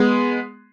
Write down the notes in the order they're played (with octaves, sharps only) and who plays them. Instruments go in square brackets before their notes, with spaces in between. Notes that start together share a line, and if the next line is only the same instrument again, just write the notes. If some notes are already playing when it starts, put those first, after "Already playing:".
Already playing: [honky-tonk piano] G#3 B3